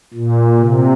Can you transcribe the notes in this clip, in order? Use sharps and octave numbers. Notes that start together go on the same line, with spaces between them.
A#2
C3